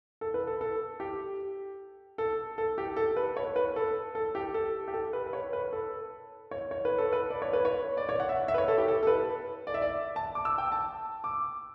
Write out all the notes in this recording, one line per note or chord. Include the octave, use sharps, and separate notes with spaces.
A4
B4
A4
A4
G4
A4
A4
G4
A4
B4
C#5
B4
A4
A4
G4
A4
G4
A4
B4
B4
C#5
B4
A4
C#5
C#5
B4
A4
B4
D5
C#5
B4
C#5
D5
C#5
F#5
E5
E5
B4
C#5
A4
G4
A4
A4
B4
D5
E5
D5
A5
D6
E6
G5
A5
D6